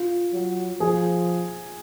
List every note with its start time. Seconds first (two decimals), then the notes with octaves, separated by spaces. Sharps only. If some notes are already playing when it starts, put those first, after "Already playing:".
Already playing: F4
0.33 F#3
0.80 F3 G#4